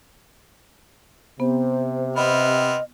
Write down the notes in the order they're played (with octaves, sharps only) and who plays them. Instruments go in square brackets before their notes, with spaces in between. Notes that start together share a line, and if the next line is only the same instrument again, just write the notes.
[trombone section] C3 [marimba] B3 [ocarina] C5
[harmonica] B3 C4 F6 [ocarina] D#5 [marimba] B5